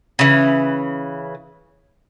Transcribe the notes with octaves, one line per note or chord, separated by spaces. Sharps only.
C#3 E3